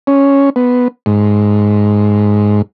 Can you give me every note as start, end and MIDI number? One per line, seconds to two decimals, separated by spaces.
0.07 0.50 61
0.56 0.88 59
1.06 2.62 44